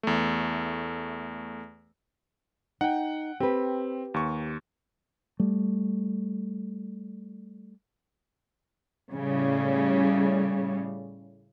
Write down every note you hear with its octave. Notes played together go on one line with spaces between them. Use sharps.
E2 A3
D#4 F#5 G5
C4 G4 B4
D#2 C#6
G3 A3
A2 C#3 G3